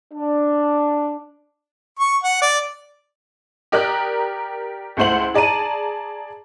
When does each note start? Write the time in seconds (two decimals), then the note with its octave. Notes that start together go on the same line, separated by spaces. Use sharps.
0.13 D4
1.99 C#6
2.24 F#5
2.42 D5
3.72 G4 A#4 D5 A#5 D#6 F#6
4.97 C#2 A3 E4 C5 F#5 F#7
5.34 G#4 D5 A5 A#5 D#7